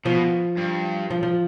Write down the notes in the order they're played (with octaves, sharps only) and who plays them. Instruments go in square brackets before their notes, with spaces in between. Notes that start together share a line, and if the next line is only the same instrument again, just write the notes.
[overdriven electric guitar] B2 [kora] F3
[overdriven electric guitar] G2
[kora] F3
F3